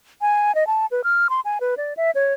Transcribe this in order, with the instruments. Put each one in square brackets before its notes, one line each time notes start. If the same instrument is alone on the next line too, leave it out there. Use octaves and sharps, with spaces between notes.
[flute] G#5
D#5
A5
B4
F6
C6
G#5
B4
D5
E5
C#5